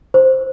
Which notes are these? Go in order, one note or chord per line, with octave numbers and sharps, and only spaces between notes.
C5